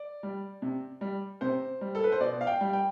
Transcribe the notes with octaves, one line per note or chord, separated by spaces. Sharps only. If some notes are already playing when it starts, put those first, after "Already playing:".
Already playing: D5
G3
C3
G3
C3 C5
G3
A4
B4
C5
B2 D5
F5
G5
G3
G5